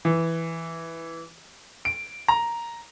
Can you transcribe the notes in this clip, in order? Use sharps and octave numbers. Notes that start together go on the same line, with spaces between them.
E3
D7
A#5